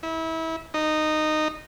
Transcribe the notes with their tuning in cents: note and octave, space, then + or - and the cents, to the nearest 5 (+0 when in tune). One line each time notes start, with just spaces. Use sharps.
E4 -25
D#4 -15